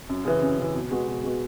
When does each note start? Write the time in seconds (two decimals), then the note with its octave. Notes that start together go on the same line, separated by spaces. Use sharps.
0.09 F#2
0.25 C#3 E3
0.42 F#2
0.58 C#3 E3
0.74 B2
0.91 G#3 B3 F#4
1.08 B2
1.24 G#3 B3 F#4